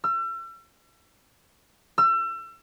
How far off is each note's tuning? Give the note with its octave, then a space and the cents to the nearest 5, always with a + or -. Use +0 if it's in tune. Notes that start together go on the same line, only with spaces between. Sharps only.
E6 +40
E6 +35